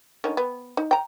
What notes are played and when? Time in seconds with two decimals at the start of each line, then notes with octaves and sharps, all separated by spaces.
0.24 D3 D#3 C#4
0.37 B3
0.77 D#4
0.91 G5 A#5